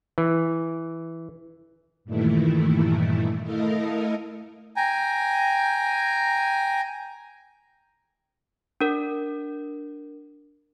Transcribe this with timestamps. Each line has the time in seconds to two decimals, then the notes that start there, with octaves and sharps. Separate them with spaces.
0.18 E3
2.05 G2 A#2 D#3 E3 A3 E4
3.42 A3 E4 A4 A#4 D#5 F5
4.76 G5 G#5 A#5
8.81 D4 A#4